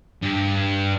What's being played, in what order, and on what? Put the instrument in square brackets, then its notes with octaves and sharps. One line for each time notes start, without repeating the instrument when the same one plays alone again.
[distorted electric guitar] G2